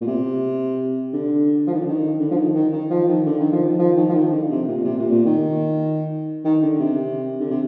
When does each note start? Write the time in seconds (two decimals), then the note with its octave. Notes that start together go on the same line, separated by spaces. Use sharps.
0.01 A#2
0.07 C3
1.14 D3
1.67 F3
1.74 D#3
1.81 D3
1.89 D#3
2.19 D3
2.31 F3
2.37 D#3
2.55 D#3
2.72 D#3
2.90 F3
3.08 D#3
3.26 D3
3.40 D#3
3.52 F3
3.66 D#3
3.79 F3
3.97 D#3
4.09 F3
4.15 D#3
4.32 D3
4.50 C3
4.68 A#2
4.85 C3
4.99 A#2
5.11 A#2
5.26 D#3
6.45 D#3
6.63 D3
6.80 C3
7.40 D3
7.51 C3